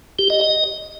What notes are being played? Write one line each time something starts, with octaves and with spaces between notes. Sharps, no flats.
G4
D#5
D#5